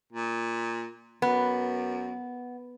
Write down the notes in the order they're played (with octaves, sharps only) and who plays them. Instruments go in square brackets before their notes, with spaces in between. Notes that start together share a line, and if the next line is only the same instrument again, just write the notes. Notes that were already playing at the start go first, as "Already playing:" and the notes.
[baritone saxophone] A#2
[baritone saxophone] F#2 [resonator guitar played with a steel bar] B3